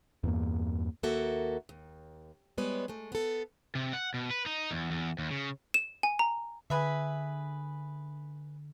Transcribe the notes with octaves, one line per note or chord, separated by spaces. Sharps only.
E2 G2 A#3
D#2 A#3 F#4 A4 E5
D#2
G3 G#3 B3 B4 C#5
G#3 A3
B3 A4
C3
F#5
B2
B4
D#4
E2
E2
D#2
C#3
E7
G#5
A#5
D3 G#4 B4 E5